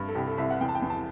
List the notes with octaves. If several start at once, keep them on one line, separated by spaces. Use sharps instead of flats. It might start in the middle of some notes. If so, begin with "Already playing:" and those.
Already playing: G2
A4
C2 G4
A4
C2 E5
F#5
E2 G5
A5
G5
E2
A5